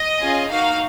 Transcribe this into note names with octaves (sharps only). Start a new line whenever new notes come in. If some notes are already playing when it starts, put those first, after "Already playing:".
Already playing: D#5
C#4 F4 G#4
A#3 D#4 F#4 F5